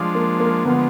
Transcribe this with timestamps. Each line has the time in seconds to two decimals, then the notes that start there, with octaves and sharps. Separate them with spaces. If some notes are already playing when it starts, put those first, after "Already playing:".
Already playing: F3 G#3 D4
0.15 A#3
0.40 A#3
0.65 D3 F3 G#3 B3